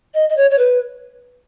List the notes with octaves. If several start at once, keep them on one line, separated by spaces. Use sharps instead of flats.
D#5
D#5
C#5
C#5
B4